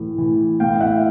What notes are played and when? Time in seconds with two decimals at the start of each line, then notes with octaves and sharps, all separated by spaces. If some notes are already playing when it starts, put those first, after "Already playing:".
Already playing: A2 E3
0.18 E3
0.60 A2 F5 G5
0.80 E5 F#5